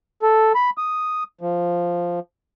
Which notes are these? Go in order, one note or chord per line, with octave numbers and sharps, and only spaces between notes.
A4
B5
D#6
F3